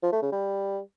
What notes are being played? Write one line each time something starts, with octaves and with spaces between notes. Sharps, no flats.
F3
A3
C#3
G3